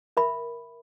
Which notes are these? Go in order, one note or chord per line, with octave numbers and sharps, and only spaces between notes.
A#4 E5 B5